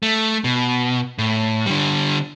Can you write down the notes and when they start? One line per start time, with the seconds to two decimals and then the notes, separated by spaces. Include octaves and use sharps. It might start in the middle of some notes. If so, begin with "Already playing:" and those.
0.03 A3
0.44 B2
1.18 A2
1.66 D3 G3